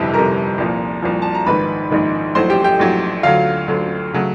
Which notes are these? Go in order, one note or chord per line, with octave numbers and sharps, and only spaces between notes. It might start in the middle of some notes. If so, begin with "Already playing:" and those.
Already playing: G1 F2 C3 E4 E5
G1 F2 C3 A#4 A#5
C2 A#2 F3
C2 A#2 F3
A5
A#5
A#1 G#2 D#3 B4 B5
A#1 G#2 D#3
A#1 A2 F#3 C5 C6
G4 G5
G4 G5
A#1 A2 F#3
D2 D3 F#3 F4 F5
D2 D3 F#3
C#3 F#3 A3